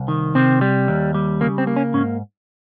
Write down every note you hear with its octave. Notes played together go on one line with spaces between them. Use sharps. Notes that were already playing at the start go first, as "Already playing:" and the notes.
Already playing: C2
D#3
C3 C4
G3
D#2
G3
C#3 A#3
C4
A#3
C#4
G#2 C#4